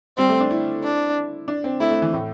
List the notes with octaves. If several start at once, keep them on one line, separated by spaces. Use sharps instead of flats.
G3 C4
A3
D4
E4
D4
D4
C4
A3 E4
A3
E3
A2